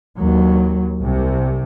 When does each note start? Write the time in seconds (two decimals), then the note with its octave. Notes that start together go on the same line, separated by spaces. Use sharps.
0.19 D#2 F#3
1.02 C2 C3